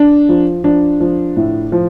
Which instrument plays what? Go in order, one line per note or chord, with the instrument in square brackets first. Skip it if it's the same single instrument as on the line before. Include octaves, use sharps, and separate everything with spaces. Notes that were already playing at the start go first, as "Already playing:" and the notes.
Already playing: [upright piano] D4
F3
F3 D4
F3
A2
F3